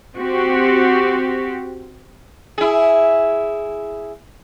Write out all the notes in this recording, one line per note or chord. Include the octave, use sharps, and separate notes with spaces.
C4 F#4 G4
E4 G#4